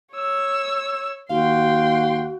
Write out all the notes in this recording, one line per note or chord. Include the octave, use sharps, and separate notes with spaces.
C#5 E6
D#2 F#4 F5 G5 C6